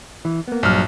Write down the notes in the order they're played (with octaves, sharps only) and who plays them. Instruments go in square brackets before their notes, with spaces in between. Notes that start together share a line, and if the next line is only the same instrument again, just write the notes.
[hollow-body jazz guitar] E3
A#3 B3
[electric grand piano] A#1 F6 [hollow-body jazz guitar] G2 F#3